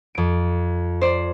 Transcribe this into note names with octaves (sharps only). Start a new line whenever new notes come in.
F2 D7
C5 D5